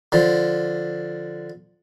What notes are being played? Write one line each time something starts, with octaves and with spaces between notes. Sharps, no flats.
D3 F3